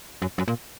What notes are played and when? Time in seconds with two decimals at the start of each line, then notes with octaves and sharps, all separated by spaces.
0.22 F#2
0.38 F#2
0.48 A#2